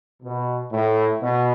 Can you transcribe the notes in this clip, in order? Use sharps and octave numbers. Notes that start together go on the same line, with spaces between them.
B2
A2
B2